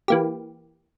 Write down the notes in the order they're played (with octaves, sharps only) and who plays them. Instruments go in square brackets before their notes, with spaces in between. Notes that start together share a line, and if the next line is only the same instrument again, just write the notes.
[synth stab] E3 A#3 G4